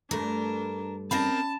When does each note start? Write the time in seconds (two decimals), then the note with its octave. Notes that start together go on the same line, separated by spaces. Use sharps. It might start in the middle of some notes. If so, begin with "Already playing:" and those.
0.11 G2 A3 D4 A#4
1.11 C4 C#4 A#4 D#5 A5 B5